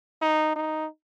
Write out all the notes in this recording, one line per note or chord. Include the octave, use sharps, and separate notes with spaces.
D#4
D#4